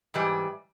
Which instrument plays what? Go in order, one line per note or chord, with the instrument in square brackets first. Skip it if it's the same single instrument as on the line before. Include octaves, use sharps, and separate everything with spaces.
[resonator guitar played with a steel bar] G#2 E3 G3